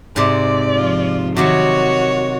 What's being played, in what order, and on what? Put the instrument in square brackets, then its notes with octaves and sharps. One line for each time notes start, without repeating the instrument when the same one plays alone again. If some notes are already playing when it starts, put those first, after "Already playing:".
[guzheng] G#2 C3 [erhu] D5
[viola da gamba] F3 F4
[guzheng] C3 D#3 F#3 [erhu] F#4 [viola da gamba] C#5